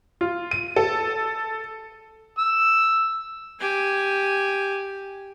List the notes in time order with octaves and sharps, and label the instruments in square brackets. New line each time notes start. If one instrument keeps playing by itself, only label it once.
[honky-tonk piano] F4
D#7
A4
[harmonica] E6
[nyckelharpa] G4 G#5